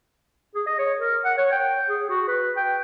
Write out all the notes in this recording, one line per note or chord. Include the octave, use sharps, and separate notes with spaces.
G#4
D#5
C#5
A#4
F#5
C#5
G5
G#4
F#4
B4
G5